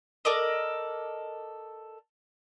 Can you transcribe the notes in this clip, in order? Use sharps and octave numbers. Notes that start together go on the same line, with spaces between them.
A4 A#4 D5 D#5